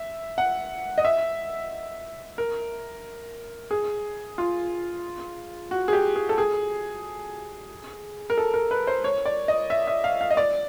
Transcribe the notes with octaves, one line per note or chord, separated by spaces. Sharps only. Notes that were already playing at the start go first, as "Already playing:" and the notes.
Already playing: E5
F#5
D#5
E5
A#4
G#4
F4
F#4
G#4
G4
G#4
A4
G#4
A#4
A4
A#4
B4
C5
C#5
D5
D#5
E5
E5
F5
F5
D#5
D5